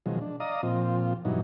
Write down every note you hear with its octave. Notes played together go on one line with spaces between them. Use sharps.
B2 D#3 F3 F#3 G#3
D4
D5 D#5 F5 A#5 D#6
A#2 F3 C4 F4
G2 B2 E3 F#3 D#4